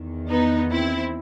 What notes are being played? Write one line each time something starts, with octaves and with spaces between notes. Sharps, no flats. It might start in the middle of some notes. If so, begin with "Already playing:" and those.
Already playing: E2 D#3
B3 D#4
C4 E4